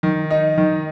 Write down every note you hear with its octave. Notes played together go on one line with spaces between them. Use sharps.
D#3
D#4
D#3